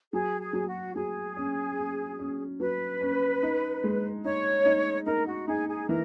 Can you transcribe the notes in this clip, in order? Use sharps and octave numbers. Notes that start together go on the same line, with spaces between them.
F#3 G#4
G#4
F#3
F#4
F#3 G#4
C#4
C#4
C#4
F#3 B4
C#4
D#4
G#3
D#4 C#5
D#4
D#4 A#4
F#4
D#4 G#4
G#4
E3 A#4